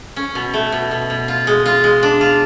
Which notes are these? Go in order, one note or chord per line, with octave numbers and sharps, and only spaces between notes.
C#4
B2
A3
B2
B2
B2
F4
G#3
F4
G#3
D4
F4